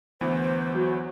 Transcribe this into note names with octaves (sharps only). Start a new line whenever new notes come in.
D2 E3 B3 C5
F#3